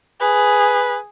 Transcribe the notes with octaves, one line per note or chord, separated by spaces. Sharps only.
G#4 B4